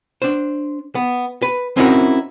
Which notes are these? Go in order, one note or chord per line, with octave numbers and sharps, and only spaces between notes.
D4 C5
B3
B4
C4 C#4 D#4 E4 F#4 A#4